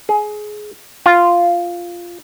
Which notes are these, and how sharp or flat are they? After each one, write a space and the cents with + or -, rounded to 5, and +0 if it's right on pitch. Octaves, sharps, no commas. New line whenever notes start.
G#4 +15
F4 -5